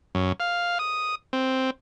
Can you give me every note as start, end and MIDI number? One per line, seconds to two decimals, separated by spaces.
0.15 0.32 42
0.40 0.78 77
0.79 1.15 87
1.33 1.70 60